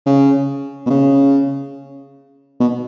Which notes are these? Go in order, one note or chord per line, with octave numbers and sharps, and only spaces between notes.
C#3
B2
C#3
B2